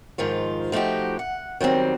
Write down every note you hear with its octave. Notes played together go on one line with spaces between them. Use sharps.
G#2 D#3 F3 F4
F3 A3 D#4 F#4 G4
F#5
D#3 F#3 G3 C4